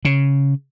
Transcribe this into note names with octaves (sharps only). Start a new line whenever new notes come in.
C#3